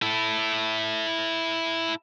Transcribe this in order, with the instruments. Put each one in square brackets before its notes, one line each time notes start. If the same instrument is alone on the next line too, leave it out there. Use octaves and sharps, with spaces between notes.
[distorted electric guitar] E4 A4